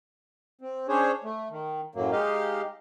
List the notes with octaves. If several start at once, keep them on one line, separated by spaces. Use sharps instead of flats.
C4
C#4 D4 G#4 C5 C#5
A3
D#3
F#2 A2 F#3 A#3
G#3 D#4 G4 D#5 F5